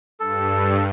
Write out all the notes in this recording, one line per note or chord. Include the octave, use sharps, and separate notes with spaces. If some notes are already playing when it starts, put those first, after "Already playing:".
G2 A4